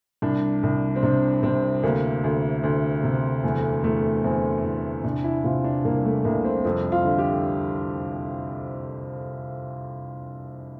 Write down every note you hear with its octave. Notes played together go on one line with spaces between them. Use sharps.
C2 D4
C2
C4
C3 D4
C3 C4
D2 A#3
D2
D2
C3
E2 A3
E2 A3
E2 C4
E2
C3 D4
E4
C3 F4
D4
C2 A#3
A3
C2 A#3
C4
F2 C4
F4
D3
G4